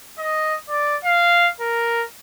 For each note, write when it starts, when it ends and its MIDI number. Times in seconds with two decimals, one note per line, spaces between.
0.19 0.54 75
0.70 0.97 74
1.05 1.49 77
1.60 2.03 70